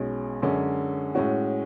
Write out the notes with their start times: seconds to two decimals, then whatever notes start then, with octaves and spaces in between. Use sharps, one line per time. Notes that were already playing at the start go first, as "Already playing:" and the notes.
Already playing: B1 B2 G#3 C#4
0.42 F#2 D3 G#3 C#4
1.15 A2 G#3 C#4 F#4